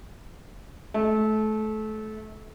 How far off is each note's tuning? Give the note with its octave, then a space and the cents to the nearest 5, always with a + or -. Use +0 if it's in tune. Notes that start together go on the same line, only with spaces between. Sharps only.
A3 -25